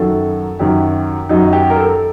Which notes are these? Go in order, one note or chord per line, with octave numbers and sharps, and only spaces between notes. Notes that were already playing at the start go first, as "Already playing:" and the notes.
Already playing: F#2 D#3 F#3 A4
F#2 D#3 F#3 G4
F#2 D#3 F#3 D#4
G4
A#4
A4